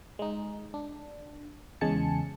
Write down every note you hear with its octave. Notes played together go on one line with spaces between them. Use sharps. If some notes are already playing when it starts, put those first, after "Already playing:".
G#3 D#4
D4
E2 C#3 G#3 G#5 A5 C#7